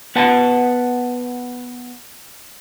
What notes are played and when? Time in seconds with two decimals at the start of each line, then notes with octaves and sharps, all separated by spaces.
0.16 B3 B4 F#5 A5